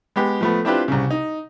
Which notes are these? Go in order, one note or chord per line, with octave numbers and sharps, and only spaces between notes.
G#3 B3 G4
F3 A3 B3
C4 D4 E4 F4 G4 B4
C2 C#3
D#4